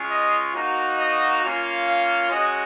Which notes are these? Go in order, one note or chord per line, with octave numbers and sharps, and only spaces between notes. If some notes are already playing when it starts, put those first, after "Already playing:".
Already playing: G#3 C#4 F4
D#5
A#3 D#4 F#4
D#5
A#3 C#4 F4
F5
G#3 C#4 F#4 D#5